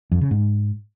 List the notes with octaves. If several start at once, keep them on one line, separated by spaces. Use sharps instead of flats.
F2
C#3
G#2